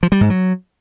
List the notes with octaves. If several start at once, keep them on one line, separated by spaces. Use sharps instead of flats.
F3
G3
G#2
F#3